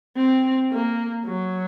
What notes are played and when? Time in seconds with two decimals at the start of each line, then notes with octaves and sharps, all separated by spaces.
0.17 C4
0.71 A#3
1.26 F#3